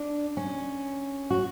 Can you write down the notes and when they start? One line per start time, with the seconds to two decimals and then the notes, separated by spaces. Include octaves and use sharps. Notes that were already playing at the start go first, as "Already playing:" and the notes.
Already playing: D4
0.37 C#4
1.30 F#4